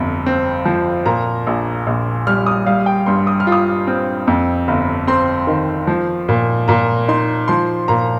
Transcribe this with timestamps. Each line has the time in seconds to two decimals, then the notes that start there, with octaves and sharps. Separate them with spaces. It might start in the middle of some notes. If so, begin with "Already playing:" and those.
Already playing: G1 F2
0.26 C4
0.66 F3
1.06 A#2 A#5
1.47 A#1
1.87 A#1
2.27 G3 F6
2.46 D#6
2.66 G3 F5
2.86 G5
3.06 G2 C6
3.27 D#6
3.40 F6
3.47 F4
3.52 D#6
3.87 C4
4.28 F2
4.68 G1
5.07 C4 C6
5.47 D#3
5.87 F3
6.29 A#2
6.68 A#2 A#5
7.08 D#4 C6
7.48 F3 C6
7.88 A#2 A#5